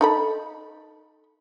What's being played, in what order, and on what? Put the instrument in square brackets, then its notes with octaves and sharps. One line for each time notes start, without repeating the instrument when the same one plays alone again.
[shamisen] D#4 A4 B5